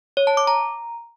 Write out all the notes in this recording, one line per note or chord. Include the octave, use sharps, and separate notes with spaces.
C#5
A5
D6
A#5